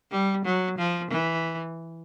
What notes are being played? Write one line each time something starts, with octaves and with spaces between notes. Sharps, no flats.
G3
F#3
F3
E3